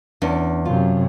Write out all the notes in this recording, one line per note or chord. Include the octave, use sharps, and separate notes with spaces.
E2 C#4 D4
F#2 C3 F4